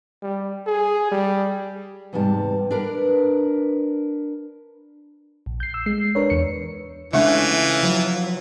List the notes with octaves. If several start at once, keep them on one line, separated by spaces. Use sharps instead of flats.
G3
G#4
G3
E2 G#2 C3 G3 A5
D4 A#4 B4
A#1
G6 C7
E6
G#3 C7
D4 A#4 B4 C#5
E2 C#7
C#3 E3 G#3 A3 C#4 D4 F4 E5
F3 F#3